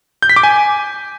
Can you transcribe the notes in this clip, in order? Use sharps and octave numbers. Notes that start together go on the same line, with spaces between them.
G6
B6
D6
G#5